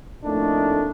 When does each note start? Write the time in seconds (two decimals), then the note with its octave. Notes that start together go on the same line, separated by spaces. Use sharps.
0.25 F2 A2 A3 A#3 D4 D#4